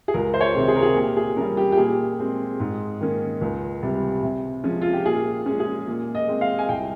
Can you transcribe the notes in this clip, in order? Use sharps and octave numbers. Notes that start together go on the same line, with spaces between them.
G#4
C#2 A#4
C5
C#5
C3 D#3 G#3 C4
G#4
A#4
G#4
A#2 G4
G#4
G3 C#4 A#4
G4
G4
A#2 G#4
G#3 C4
G#2
D#3 A#3 C#4
C#2
C3 G3
C3
F3 G#3 C#4
F4
G4
A#2 G#4
G#3 C#4
G#4
A#2
D#5
G#3 C4
F5
G#5
C2 G5